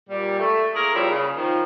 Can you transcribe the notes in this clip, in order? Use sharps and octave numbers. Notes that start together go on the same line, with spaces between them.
A#2 G3
A3
A#3 E4 G#4 A#4
A#2 C#3 F3 G3 E4
C#3
D#3 F3